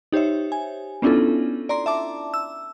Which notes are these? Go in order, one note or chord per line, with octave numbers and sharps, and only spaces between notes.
D#4 G4 C5 C#5 E5
G#5
B3 C#4 D4 E4 F4 A4
D5 A#5 C6
E5 A5 D6
E6